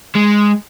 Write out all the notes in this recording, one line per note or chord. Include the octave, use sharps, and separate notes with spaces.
G#3